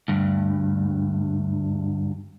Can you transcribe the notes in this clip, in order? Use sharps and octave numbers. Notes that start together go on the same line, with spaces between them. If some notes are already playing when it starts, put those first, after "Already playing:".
D2 G2